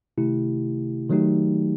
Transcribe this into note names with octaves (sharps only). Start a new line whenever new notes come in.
C3 D#3 A3 E4 G4
D#3 F#3 A3 D#4 G4